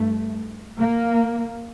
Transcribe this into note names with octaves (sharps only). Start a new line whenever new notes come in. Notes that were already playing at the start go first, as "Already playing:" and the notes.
Already playing: G2 A3
A#3